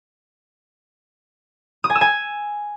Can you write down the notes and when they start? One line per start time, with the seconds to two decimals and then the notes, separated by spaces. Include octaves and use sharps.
1.84 D#6
1.90 G#5
1.95 E6
2.01 G#5